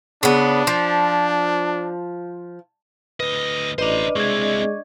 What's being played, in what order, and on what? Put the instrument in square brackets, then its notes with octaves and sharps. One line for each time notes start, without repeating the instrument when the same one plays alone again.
[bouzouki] C#3 B3 [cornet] D4
[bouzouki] F3
[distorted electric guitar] D2 D#5 [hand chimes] B4
[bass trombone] A1 [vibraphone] D4 D5 D#5 [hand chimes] B4 [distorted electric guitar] C5 A#5
[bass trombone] G#3 [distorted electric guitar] C4 E4 [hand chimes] C#6 G#6